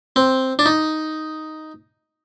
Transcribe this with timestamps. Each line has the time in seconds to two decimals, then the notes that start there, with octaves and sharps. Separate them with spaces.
0.16 C4
0.59 D4
0.66 D#4